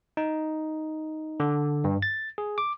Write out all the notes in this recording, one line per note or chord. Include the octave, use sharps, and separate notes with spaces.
D#4
D3
G2
A6
G#4
D6